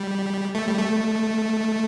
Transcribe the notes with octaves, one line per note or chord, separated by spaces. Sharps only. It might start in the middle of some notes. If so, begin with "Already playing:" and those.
Already playing: G3
A3
G3
A3